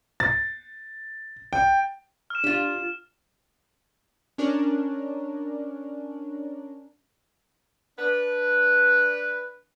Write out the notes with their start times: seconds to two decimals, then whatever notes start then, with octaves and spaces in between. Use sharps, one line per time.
0.20 A6
1.53 G5
2.30 F6 E7
2.44 D4 F4 G4
4.38 C#4 D4 A#4
7.99 D4 B4